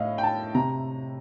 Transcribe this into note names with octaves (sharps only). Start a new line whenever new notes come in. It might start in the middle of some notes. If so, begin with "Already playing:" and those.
Already playing: A2 D#5 F5
G5
A5
C3 A#5